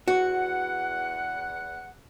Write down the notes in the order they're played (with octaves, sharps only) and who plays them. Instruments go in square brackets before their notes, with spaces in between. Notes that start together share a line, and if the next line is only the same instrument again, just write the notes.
[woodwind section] E2 F#5 [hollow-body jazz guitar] F#4